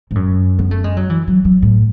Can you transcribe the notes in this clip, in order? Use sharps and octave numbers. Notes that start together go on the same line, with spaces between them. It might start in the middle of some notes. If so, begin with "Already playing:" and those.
G#2
F#2
B3
A3
G#3
F#3
E3
F#3
F#3
A2